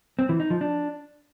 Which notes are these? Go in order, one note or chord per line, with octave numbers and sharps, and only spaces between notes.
C4
E3
D#4
F3
D4